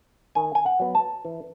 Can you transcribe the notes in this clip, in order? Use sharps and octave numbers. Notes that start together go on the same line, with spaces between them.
D#3 G#5
G#5
F#5
F#3 B3
A5
E3